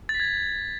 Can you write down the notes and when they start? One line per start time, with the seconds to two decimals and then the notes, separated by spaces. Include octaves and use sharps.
0.09 A6
0.14 B6
0.20 G#6
0.25 A6